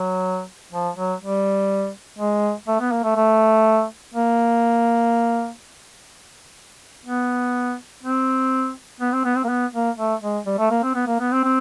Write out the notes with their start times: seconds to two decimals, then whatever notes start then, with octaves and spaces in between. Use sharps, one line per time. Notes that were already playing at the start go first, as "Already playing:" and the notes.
Already playing: F#3
0.72 F3
0.97 F#3
1.22 G3
2.18 G#3
2.67 A3
2.80 B3
2.91 A#3
3.04 A3
3.16 A3
4.14 A#3
7.06 B3
8.03 C4
9.01 B3
9.12 C4
9.25 B3
9.36 C4
9.44 A#3
9.49 B3
9.73 A#3
9.98 A3
10.22 G#3
10.46 G3
10.59 A3
10.71 A#3
10.83 C4
10.95 B3
11.07 A#3
11.20 B3
11.32 C4
11.44 C4